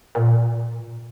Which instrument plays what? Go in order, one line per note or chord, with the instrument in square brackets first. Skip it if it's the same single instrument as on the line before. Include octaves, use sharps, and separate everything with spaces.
[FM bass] A#2